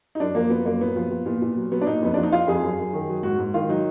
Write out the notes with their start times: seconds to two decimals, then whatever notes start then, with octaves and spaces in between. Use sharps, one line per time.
0.15 D#4
0.20 F#2 D4
0.35 F3 A#3
0.49 F3 B3
0.65 F#2 A#3
0.81 A#2 B3
0.96 F3
1.11 F3
1.26 A#2
1.42 A#2
1.56 F#3
1.72 F#3 B3
1.81 D4
1.86 A#2 D#4
2.02 F2 B3
2.14 F3 D4
2.23 D#4
2.32 F3 F4
2.47 F2 G#4
2.63 F#2
2.79 F#2
2.93 D#3
3.09 F#3
3.23 G#2 F#4
3.38 G#2
3.54 D#3 F4
3.69 F#3 D#4